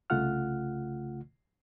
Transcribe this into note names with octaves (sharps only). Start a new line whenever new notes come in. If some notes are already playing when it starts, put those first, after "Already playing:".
C2 C#3 A3 F4 F#5 F6